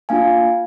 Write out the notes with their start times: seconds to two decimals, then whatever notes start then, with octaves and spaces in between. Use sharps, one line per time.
0.09 A#3 D4 F4 F5 G#5